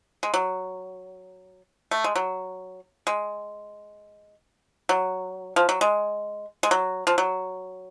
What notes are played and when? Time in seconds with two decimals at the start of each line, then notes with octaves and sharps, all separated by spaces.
0.23 G#3
0.34 F#3
1.91 A3
2.04 G#3
2.16 F#3
3.07 G#3
4.89 F#3
5.56 F3
5.69 F#3
5.81 G#3
6.63 G#3
6.71 F#3
7.07 F3
7.18 F#3